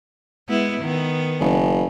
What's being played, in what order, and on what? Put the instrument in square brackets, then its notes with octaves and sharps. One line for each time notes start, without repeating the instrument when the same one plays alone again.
[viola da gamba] G#3 B3 E4
D#3 B3
[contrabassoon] F#1